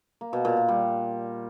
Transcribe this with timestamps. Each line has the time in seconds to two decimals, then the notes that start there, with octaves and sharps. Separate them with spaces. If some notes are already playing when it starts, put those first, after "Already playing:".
0.21 A#3
0.33 B2
0.45 A#2
0.57 A#2
0.68 G3